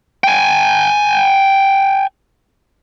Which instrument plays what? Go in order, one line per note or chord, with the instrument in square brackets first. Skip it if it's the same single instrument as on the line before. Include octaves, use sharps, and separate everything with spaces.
[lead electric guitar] G5 G#5